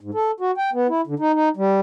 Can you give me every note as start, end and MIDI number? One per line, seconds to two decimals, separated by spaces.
0.01 0.11 44
0.14 0.31 69
0.40 0.51 66
0.57 0.70 79
0.73 0.87 59
0.89 1.01 64
1.07 1.15 50
1.20 1.32 63
1.34 1.49 63
1.57 1.80 55